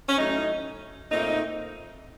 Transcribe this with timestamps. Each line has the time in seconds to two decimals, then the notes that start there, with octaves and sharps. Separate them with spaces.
0.08 C#4
0.18 A2 F#3 A3 D#4
1.11 A#2 A3 C4 D#4